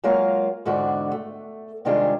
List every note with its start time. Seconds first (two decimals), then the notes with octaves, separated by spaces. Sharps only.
0.04 F#3 G#3 A#3 F4 A#4 F5
0.66 E2 G#2 D3 F#4 D5
1.12 A3
1.85 C3 D#3 G3 G#3 D4 F4